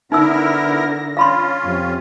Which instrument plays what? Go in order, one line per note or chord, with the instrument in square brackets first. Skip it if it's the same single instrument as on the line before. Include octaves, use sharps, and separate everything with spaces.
[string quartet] D3 A#6 [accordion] B3 E4 A#4 [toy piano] D#4 E6
[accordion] C#4 F4 [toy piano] F5 B5 C6
[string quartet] F2 C3